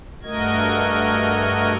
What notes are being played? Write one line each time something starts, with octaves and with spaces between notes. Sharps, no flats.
G2 A3 F#4 A#4 D#5 G#6